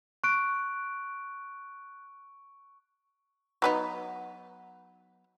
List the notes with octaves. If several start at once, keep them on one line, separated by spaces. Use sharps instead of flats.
C#6 F#6 D7
F#3 B3 D#4